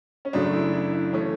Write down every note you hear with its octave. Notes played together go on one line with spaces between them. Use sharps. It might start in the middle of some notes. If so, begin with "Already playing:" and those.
C#4
F#2 C#3 F#3 A3 D4
E4
E4
D4
E3 A3 C#4